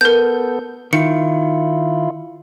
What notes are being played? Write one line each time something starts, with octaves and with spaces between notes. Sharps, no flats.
B3 A4 A#4 G6
D#3 E4 F4 C#7